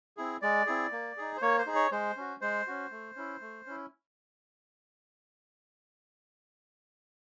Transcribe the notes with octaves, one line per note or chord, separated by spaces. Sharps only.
C4 E4 G#4
G#3 D5
C4 E4 G#4
A#3
D#4 G#4
C5
A#3 C#5
C5
D#4 G#4
C#5
G#3 C5
C#4 F#4
G#3 C5
C#4 F#4
A3
C#4 E4
A3
C#4 E4